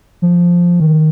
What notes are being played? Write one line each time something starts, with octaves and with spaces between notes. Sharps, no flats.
F3
D#3